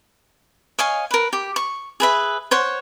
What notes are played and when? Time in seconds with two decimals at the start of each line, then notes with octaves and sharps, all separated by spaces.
0.79 C#5 D#5 F5 G#5
1.11 A#4 B4
1.33 G4
1.56 C#6
2.00 G#4 B4 E5
2.51 C5 C#5 F#5